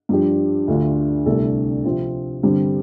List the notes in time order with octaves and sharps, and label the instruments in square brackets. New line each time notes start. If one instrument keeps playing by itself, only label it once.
[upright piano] G2 F3 D4 G4
D2 D3 A3 D4 F4
C2 C3 A3 D4 A4
C3 F3 C4 F4
G2 D3 G3 C4